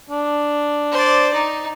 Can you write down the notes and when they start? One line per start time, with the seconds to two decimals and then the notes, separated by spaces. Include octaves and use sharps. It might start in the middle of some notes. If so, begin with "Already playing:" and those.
0.10 D4
0.92 C5 D5
1.34 D#4